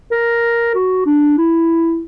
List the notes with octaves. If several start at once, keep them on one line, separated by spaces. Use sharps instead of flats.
A#4
F#4
D4
E4